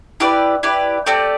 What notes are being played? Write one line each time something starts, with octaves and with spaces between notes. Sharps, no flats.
E4 G4 B4 D5
E4 G4 B4 D5
A3 C4 G4 D5